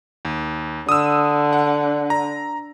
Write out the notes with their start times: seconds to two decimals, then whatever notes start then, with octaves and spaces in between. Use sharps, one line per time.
0.25 D#2
0.89 D3 D#6 E6
1.53 F#5
2.10 A#5